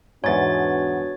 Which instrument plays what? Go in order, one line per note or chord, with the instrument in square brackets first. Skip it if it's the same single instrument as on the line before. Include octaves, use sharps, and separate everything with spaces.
[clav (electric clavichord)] E2 G#2 [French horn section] B3 D4 F#4 [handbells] C#5 A6